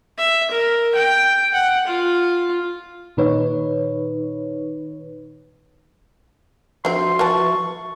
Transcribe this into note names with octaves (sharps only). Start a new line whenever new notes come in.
E5
A#4
G5
F#5
F4
A#2 D#3 D#4 B4 C#5
D3 F3 C4 F#4 E5 C6
E3 B4 A5 C#6